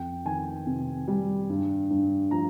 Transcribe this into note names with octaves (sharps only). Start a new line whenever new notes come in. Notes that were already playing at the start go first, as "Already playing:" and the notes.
Already playing: F2 G5
D#3 G#5
C3
G3
G2
G2
F3 A#5